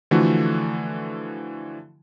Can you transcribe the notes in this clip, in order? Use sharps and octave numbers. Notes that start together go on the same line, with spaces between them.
D3 E3 F3 A3 F#4